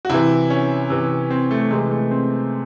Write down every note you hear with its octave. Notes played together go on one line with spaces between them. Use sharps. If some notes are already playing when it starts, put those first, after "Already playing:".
F#4
C3 E3 E4
C#4
C3 E3
C4
A3
C3 E3 G#3
A3
C4